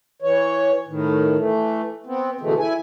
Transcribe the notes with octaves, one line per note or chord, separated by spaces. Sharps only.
E3 C#5
A2 D#3
E3 A3
B3 C4
B2 D3 E3 G#3 A3
E4 G#5